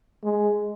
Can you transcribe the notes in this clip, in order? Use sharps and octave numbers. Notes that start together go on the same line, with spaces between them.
G#3